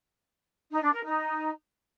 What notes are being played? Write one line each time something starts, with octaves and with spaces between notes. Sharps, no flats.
D#4
D4
A#4
D#4